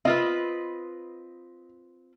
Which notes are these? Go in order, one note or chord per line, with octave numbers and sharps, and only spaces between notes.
C4 F4 B4 D#5